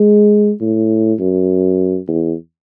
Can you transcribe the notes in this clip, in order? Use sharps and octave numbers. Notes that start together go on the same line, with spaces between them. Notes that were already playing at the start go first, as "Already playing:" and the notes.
Already playing: G#3
A2
F#2
E2